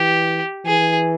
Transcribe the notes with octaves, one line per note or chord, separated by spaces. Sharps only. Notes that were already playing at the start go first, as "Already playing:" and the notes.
Already playing: E3 G4
E3 G#4